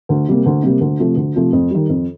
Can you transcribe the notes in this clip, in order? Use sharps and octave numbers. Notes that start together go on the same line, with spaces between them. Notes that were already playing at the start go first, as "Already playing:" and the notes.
D2
C3 G3 A#3
D2
C3 G3 A#3
D2
C3 F3 A3
D2
C3 F3 A3
F2
D#3 G3
F2